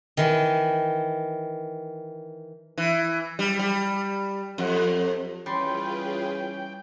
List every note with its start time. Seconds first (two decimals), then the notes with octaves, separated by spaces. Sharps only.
0.17 D#3 E3
2.78 E3
3.39 G3
3.59 G3
4.58 F2
5.46 E3 G3 C#4 F4 G#4 B4 G5 C6